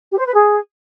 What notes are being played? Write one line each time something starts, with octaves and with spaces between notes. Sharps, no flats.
G4
C5
B4
G#4